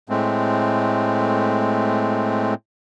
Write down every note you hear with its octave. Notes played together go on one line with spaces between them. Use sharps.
A2 G#3 A3 C4